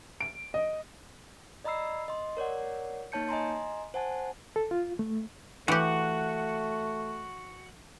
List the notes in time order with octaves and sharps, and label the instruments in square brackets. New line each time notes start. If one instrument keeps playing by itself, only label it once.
[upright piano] D7
D#5
[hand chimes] D5 D#5 A#5 B5 E6 C7
D#5 C6
A#4 C#5 D5 F#5
A#3 D#4 C#5 A5 G6 C#7
D#5 G#5 A#5 C6
C5 F#5 G#5 A5
[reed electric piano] A4
F4
A3
[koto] E3 G4 [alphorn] A3 [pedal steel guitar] F#4 F#5